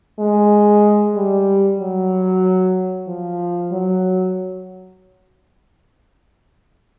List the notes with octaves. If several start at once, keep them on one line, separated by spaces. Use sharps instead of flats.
G#3
G3
F#3
F3
F#3